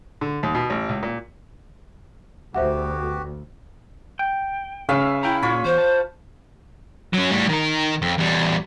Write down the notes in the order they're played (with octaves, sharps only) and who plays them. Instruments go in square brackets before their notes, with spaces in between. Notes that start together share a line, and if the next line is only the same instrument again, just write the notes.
[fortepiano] D3
D#2
B2
A1
C#2
A#2
[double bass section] D2 [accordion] B3 F#4 G4 [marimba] C5 E5 F#5
[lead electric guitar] G5
[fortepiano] C#3 [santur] B4 E5 F5
[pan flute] E4 [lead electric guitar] G5 A#5
[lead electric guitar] A#2 A#3 [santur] F4 C#5 B5
[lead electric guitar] E2 [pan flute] C5
[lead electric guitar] A5
[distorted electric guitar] F#3 C#4
A2 G3
D#3 A#4
F2
E2 G3